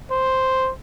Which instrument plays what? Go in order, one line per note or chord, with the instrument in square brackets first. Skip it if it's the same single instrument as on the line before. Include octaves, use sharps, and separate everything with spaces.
[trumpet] C5